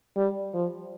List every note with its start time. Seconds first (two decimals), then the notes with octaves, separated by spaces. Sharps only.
0.16 G3
0.54 F3